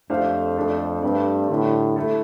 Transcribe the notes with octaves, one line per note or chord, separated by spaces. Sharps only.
F2 A3 D4 G4 C5 F5
A3 D4 A4 C5
G2 A3 C4 G4 D5
A2 D3 G3 D4
A3 E4 A4